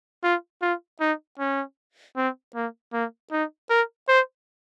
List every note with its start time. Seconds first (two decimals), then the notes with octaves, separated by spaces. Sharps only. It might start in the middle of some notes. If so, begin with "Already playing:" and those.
0.23 F4
0.62 F4
1.00 D#4
1.39 C#4
2.17 C4
2.55 A#3
2.93 A#3
3.32 D#4
3.70 A#4
4.09 C5